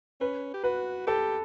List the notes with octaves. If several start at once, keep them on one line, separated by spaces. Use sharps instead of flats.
C#4 B4
G4
F#4 B4
G4 A4